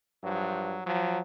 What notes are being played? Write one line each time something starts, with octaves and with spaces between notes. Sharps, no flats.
G2 F3 F#3
F3 F#3